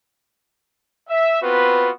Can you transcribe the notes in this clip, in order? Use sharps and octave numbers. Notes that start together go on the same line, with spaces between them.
E5
B3 C4 F4 F#4 B4